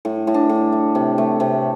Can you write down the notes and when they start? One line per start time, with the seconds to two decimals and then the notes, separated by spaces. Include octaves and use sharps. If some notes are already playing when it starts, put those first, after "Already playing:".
0.05 A2
0.27 A2
0.34 D4
0.49 A2
0.72 A3
0.95 C3
1.18 A3
1.40 C3